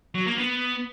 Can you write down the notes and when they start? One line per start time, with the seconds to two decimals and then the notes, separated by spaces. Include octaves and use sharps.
0.15 F#3
0.26 A#3
0.38 B3